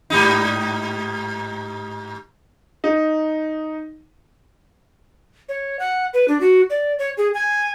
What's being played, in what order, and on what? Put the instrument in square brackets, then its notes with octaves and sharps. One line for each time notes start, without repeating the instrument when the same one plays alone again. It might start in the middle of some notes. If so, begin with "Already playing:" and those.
[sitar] G#2 G3 D#4
[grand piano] D#4
[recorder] C#5
F#5
B4
D4
F#4
D5
C#5
G#4
G#5